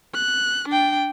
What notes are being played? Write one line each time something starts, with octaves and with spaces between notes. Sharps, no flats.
F#6
D4 G5